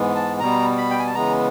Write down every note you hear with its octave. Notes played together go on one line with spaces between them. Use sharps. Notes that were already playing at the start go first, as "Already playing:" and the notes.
Already playing: G#2 E3 G#3 B3
A5
B2 G3 B3 A#5
B5
G5
G#5
A5
C#3 E3 G#3 B3 A#5